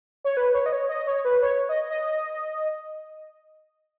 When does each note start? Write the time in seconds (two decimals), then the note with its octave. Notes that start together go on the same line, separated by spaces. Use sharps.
0.24 C#5
0.37 B4
0.54 C#5
0.66 D#5
0.72 C#5
0.89 D#5
1.07 C#5
1.25 B4
1.42 C#5
1.69 D#5
1.90 D#5